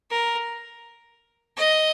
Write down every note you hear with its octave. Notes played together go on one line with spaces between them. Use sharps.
A#4
D#5